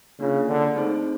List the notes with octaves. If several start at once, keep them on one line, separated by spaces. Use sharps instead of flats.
C#3 A#3 D4 F4
D3
A3 C4 D#4 G#4 C5